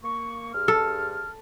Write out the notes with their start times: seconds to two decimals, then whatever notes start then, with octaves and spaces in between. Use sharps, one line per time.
0.04 A#3 C#6
0.53 G2 G#4 F6
0.68 A4